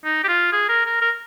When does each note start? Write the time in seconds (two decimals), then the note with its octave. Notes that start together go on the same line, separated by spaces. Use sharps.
0.05 D#4
0.24 G4
0.28 F4
0.53 G#4
0.69 A#4
0.85 A#4
1.02 A#4